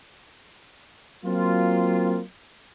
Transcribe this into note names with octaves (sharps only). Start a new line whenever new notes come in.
F#3 A#3 C4 F4